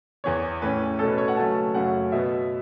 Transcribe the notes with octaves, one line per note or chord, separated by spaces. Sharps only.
E2 E3 B3 C#5
A2 E3 C#4 B4
B2 A3 C#4 A4
B4
C#5
F#5
C#3 F#3 A3 C#4 A5
F#2 C#3 F#3 A3 C#4 F#5
B2 B3 E5